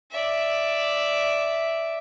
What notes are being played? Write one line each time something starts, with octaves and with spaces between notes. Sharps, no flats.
D5 E5